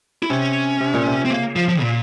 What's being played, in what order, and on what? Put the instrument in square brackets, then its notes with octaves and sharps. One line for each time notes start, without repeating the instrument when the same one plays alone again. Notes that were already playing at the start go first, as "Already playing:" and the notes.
[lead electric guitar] E4
[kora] C3 [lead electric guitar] C#4
[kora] C3
A#2
C3
[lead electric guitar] C4
[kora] C#3 [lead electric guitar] A#3
[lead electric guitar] F3
F3
A#2